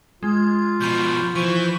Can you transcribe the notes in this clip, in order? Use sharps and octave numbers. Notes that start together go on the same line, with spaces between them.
G#3 F4
B2 F3 B5 C#6 G6
E3 F3 C#6 G6